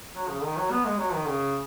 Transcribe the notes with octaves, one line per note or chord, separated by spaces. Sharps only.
F#3
C#3
D#3
F#3
B3
G#3
F#3
D#3
C#3